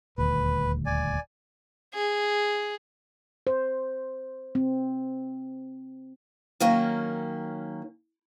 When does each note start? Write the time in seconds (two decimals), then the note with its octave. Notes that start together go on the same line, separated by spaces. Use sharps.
0.18 D#1 D2 B4
0.86 D5 G#5
1.94 G#4
3.47 C5
4.55 C4
6.60 D#3 F#3 A#3 C#4